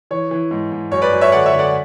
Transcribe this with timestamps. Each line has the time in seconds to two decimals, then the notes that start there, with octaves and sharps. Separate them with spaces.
0.11 E3 C#5
0.31 E3
0.51 G#2
0.72 G#2
0.91 F#2 C#5
1.02 B4 D5
1.12 F#2
1.21 C#5 E5
1.32 D3 D5 F#5
1.46 C#5 E5
1.52 D3
1.59 D5 F#5